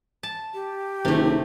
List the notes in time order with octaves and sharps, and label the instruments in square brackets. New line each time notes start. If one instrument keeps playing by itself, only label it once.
[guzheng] A5
[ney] G4
[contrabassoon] F#1 [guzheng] C3 A3 [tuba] D#3